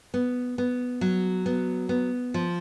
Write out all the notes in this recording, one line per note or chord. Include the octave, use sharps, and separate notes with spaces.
B3
B3
F#3
B3
B3
F3